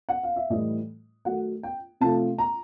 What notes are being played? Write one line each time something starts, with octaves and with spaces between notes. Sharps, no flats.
F#5
F5
E5
A2 E3 G3 D#5
D#3 F#3 A3 F#5
G5
C3 F3 A3 A5
A#5